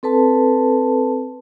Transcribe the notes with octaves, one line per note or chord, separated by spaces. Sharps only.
C4 A4 B4 A5